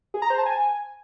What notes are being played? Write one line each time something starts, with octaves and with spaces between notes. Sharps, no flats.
G#4
A#5
C5
A5
G#5